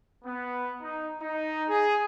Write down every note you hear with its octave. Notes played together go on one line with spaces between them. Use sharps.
B3
D#4
D#4
G#4